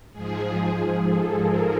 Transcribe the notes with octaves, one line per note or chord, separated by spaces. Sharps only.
G#2 F3 G#4
A4
A#4